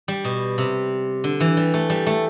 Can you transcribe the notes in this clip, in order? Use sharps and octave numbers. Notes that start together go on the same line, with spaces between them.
G3
B2
C3
D3
E3
G3
A3
G3
A3